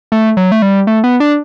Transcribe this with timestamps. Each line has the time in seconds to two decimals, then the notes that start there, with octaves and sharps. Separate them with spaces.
0.12 A3
0.37 F#3
0.52 A3
0.62 G3
0.87 A3
1.04 B3
1.20 D4